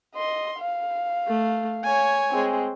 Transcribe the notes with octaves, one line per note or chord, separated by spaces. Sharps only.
D#5 C6
F5
A3
C#5 G#5
G#3 C4